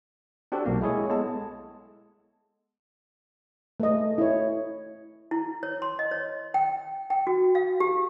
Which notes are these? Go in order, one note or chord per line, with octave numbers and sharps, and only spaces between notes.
C4 D4 F#4 G4 A4
B1 A#3
G#3 E4 G#4 C#5
G#3 B3 A4 A5
A3 D#5
E4 C#5
E4
C#5
C6
D#5
C#5
G5
G5
F#4
F5
G4